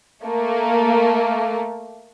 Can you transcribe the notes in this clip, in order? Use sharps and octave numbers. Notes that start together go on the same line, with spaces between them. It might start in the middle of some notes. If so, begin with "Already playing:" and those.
A3 A#3